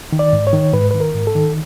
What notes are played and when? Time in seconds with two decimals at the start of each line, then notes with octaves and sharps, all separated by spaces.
0.12 D#3
0.19 D5
0.33 G#2
0.47 C#5
0.53 D#3
0.73 G#2 B4
0.91 D#3 B4
1.00 A#4
1.14 G#2
1.27 A4
1.35 D#3